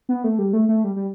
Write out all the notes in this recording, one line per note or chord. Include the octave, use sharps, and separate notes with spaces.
B3
A3
G3
A3
A3
G3
G3